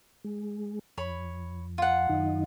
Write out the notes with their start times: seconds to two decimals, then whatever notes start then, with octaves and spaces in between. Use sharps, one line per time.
0.24 G#3
0.98 F2 C#5 B5
1.78 F4 F#5
2.09 F#2 D#3 D#4